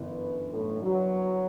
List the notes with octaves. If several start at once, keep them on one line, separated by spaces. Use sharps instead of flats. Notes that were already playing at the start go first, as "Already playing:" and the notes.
Already playing: G1 F#2 E3 B3
A2
F#3